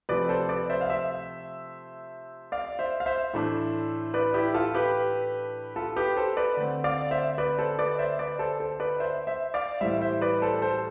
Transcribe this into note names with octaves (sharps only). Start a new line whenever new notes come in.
C3 F3 A3 B4 D5
A4 C5
B4 D5
C5 E5
F5
C5 E5
D5 F5
C5 E5
F5
C5 E5
A2 E3 A3 D4
B4 D5
E4 G4
F4 A4
G4 B4
F4 A4
G4 B4
A4 C5
B4 D5
D3 A3 C4
D5 F5
C5 E5
B4 D5
A4 C5
B4 D5
C5 E5
B4 D5
A4 C5
A4 C5
B4 D5
C5 E5
C5 E5
D5 F5
A2 E3 G3 C5 E5
C5 E5
B4 D5
A4 C5
A4 C5